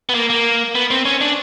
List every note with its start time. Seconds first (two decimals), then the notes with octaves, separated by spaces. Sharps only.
0.09 B3
0.15 A#3
0.30 A#3
0.75 B3
0.90 C4
1.05 C#4
1.21 D4